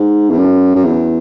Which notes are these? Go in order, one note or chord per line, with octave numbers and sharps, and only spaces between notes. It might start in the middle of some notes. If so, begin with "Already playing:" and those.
Already playing: G#2
E2
F#2
F#2
E2